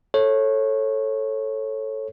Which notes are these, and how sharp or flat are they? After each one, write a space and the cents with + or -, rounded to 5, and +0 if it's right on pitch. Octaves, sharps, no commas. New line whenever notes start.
A4 +0 C#5 -20